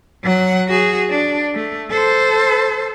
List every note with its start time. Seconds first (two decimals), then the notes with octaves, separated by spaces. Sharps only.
0.24 F#3 F#5
0.68 F#4 G#4
1.10 D4
1.55 A3
1.91 A4 C5